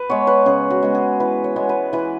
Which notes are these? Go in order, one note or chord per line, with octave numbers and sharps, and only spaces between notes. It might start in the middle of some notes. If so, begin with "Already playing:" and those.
Already playing: B4
G#3 B3 C#5
B4
C#3 G#4
F#4
G#3 B3
G#4
E3 B4
C#5
G#3 B3
B4
E3 B4